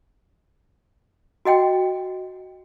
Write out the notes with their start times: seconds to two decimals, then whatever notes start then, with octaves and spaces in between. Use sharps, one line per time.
1.45 F#4 D#5 F#5 G5